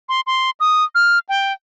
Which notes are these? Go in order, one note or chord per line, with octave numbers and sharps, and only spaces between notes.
C6
C6
D#6
F6
G5